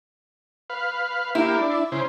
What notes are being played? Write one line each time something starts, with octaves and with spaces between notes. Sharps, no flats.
B4 F5
A#3 E4 G4
D4
C#3 C5